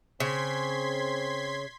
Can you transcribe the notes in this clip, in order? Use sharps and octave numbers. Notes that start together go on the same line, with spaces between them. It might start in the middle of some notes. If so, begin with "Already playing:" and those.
C#3 C4 C6 G#6 B6